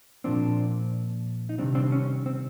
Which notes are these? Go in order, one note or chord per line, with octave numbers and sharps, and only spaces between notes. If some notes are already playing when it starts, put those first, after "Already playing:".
A#2 F3 A#3 C4 D4
D#4
C3 D#3 G3 C4 D4
C4 D4
C#4
C4